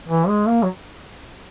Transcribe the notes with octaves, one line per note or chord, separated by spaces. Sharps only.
E3
G#3
A#3
F#3